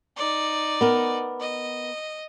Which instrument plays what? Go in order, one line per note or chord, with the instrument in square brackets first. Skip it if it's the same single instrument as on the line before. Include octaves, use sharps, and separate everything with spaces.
[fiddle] D#4 D5
[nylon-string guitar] B3 A#4
[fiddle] D#5